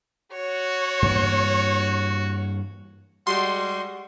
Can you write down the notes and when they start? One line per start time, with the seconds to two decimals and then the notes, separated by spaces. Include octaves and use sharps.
0.32 F#4 C#5
1.02 G2 E3 A#3
3.27 G3 G#3 F#4 C6